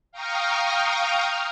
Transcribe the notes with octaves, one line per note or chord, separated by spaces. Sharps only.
F5 G5 A#5 C#6 D#6 F6